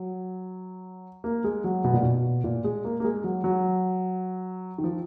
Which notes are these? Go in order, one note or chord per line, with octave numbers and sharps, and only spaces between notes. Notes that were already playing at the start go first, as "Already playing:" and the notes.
Already playing: F#3
A#3
G#3
F#3
B2
A#2
B2
A#2
G#3
A#3
A#3
G#3
F#3
F#3
D#3
F3